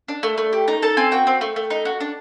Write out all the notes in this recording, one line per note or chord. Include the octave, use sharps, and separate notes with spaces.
D4
A3
A3
G4
D#4 A#5
A4 A5
C4 G#5
F#4 G5
C4
A3
A3
D#4
F#4
D4